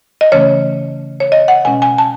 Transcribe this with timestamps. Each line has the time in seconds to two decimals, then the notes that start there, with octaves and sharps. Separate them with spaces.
0.21 D#5
0.32 C#3 E3 A3 C#4 C#5
1.20 C#5
1.32 D#5
1.48 F#5
1.65 B2 G#3 C#4 G#5
1.82 G#5
1.98 A5